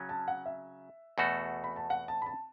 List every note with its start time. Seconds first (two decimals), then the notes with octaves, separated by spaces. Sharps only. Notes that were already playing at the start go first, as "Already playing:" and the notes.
Already playing: C#3 F#3 C#4
0.09 A5
0.28 F#5
0.46 E5
1.18 E2 B2 A3 F#4 A4
1.64 B5
1.76 A5
1.90 F#5
2.08 A5
2.22 B5
2.26 A5